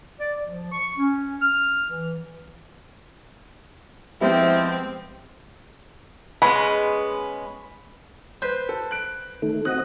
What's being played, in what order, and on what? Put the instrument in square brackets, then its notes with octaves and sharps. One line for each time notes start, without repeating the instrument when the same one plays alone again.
[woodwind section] D5
F3
C#6
C#4
F6
E3
[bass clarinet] F3 [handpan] G#3 B3 G4 [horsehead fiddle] C4 [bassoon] E4
[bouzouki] G#3 B3 C#4 [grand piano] B5
[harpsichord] B4 C5 [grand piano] G6
[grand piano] A4
F#6 D7
[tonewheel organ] D#3 A3
[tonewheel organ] C4 F#4 D#5 [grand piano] F#6